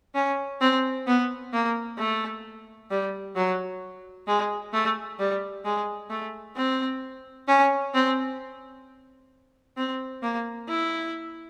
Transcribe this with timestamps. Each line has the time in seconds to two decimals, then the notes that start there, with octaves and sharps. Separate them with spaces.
0.15 C#4
0.61 C4
1.07 B3
1.53 A#3
1.98 A3
2.91 G3
3.36 F#3
4.27 G#3
4.73 A3
5.19 G3
5.65 G#3
6.10 A3
6.56 C4
7.48 C#4
7.94 C4
9.77 C4
10.23 A#3
10.69 E4